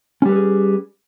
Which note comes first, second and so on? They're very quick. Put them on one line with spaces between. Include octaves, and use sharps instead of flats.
C#4 G3 B4 A4 G#4